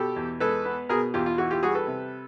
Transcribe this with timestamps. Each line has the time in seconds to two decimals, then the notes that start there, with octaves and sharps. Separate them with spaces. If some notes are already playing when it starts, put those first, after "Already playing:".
Already playing: B2 G4 A4
0.16 E2
0.40 G#3 A4 B4
0.65 B3
0.89 B2 G#4 A#4
1.14 E2 F4 G4
1.26 F4
1.38 E3 F#4
1.50 F4 G4
1.63 G3 F#4 G#4
1.75 A4 B4
1.87 C3